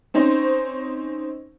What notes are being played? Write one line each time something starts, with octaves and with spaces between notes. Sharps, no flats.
C4 C#4 D#4 C5